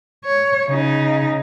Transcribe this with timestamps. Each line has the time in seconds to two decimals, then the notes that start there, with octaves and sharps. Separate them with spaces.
0.25 C#5
0.69 C#3 D#4